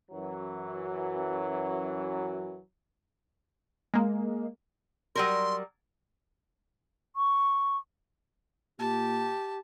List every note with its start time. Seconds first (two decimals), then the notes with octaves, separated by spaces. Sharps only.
0.11 F#2 E3 F#3
3.94 G#3 A#3
5.15 F#3 G3 A#4 C6
7.16 C#6
8.79 A#2 G4 A5